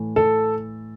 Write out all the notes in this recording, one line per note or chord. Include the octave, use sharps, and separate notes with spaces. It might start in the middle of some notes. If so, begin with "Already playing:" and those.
Already playing: A2 E3 A3
A4